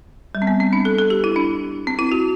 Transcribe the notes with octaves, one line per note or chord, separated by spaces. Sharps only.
G3
C4
B3
C4
D4
A4
A4
G4
E4
D4
C4
E4
F#4